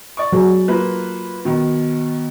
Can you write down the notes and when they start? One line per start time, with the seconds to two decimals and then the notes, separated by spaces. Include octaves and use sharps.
0.17 D5 C#6
0.33 F#3 G#4
0.68 A#3 F4 B4
1.45 B2 D#3